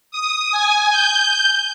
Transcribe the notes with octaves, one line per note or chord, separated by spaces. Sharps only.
D#6
G#5
G6